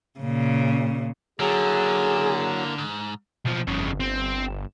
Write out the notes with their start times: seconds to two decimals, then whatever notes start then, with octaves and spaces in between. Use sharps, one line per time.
0.19 A#2 C#3
1.40 D3 F#3 A#3 E4 G#4
2.78 G#2
3.46 B1 F3
3.67 G1 F2 C#3
4.00 C4